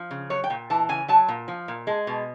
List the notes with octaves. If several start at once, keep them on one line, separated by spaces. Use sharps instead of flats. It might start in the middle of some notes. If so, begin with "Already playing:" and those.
Already playing: F3
C#3
F#3 C#5
G5
A#2
E3 A5
C#3 G#5
F#3 A5
A#2
F3
A#2
G#3
B2